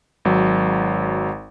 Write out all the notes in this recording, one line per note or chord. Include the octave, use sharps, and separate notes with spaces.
G#1 F#3